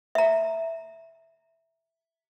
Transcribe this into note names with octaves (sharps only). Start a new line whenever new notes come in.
E5 A#5